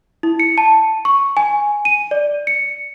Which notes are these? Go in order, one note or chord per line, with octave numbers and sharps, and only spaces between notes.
E4
C#7
A5
C#6
G#5
D#7
D5
C#7